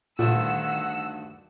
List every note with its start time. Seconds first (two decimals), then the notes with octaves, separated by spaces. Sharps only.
0.19 D2 G2 A#2 D3 D#3 F#5 E6